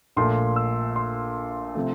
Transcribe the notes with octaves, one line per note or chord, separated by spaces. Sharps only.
A#1 A#2 A3 C6
E6
C6
C3 F3 A3